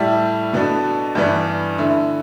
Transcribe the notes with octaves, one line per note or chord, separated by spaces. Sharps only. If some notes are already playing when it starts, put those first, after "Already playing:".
Already playing: A2 G3 E4 A4
B2 B3 D4 A4
G2 E3 G3 B3 D4
D3 A3 E4